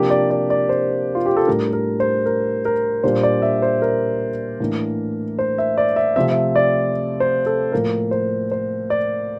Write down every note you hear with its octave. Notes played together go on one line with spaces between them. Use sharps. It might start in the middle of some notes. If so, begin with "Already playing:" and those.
Already playing: C3 F3 A#3 D4 G4
D5
D5
D5
C5
F4
G4
A4
A2 G3 D4 A#4
A#4
C5
A#4
A#4
A#2 G3 D4 C5
D5
E5
C5
A#4
A2 E3 A#3 D4
C5
E5
D5
E5
C3 F3 A3 C4 E5
E5
D5
C5
A4
A2 F3 A#3 A#4
C5
C5
D5